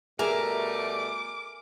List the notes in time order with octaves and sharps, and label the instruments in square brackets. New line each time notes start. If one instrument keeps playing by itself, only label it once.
[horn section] B2 G3 A3 [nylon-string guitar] G#4 E5 G#5 [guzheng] A#4 [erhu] D6